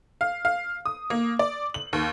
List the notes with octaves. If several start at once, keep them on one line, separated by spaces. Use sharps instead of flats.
F5
F5
D#6
A#3
D5
F#7
D#2